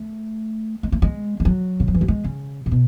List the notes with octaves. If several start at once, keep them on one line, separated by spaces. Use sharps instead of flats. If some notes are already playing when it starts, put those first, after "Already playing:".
Already playing: A3
G#3
A3
G#3
G#3
F#3
C#3
D#3
E3
F#3
G#3
C#3
A2
B2